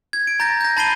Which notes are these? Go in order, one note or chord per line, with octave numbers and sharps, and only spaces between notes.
G#6
D7
A#5 G6 A6 A#6
G6 A#6
A5 B5 A6 C7 D#7 G7